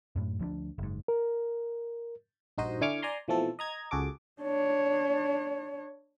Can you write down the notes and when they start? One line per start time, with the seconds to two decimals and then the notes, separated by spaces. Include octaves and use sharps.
0.16 F#2 A2
0.39 D2 F3 B3 D4
0.78 F#1 G#2
1.08 A#4
2.58 A#1 G2 D#4 F#4 C5 D#5
2.81 D3 E4 G#5 C#6 D6 F6
3.02 D5 G#5 A#5 C6
3.28 B2 E3 F3 A3 C4 A4
3.59 D#5 A#5 G#6
3.91 C#2 F#4 G#4 A4 D6
4.42 D4 C#5